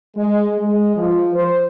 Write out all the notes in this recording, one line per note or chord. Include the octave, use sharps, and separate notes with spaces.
G#3
G#3
F3
C5